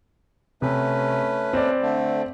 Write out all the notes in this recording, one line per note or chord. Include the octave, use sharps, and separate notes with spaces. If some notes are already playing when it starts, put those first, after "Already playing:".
C3 A3 C#4 B4
C4 D5
D3 A3